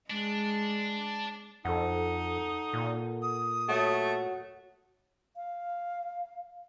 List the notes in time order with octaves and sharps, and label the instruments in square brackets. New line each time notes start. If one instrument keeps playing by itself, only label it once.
[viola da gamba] G#3 [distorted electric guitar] D4
[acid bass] F2 [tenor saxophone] D#4 [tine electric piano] A4 F#5
[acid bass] A#2
[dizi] D#6
[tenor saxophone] A3 [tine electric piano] F#4 C#5 F#5
[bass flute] F5